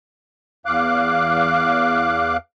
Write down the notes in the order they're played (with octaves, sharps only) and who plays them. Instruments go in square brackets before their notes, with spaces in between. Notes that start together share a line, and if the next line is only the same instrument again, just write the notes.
[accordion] E2 F5 D6 F#6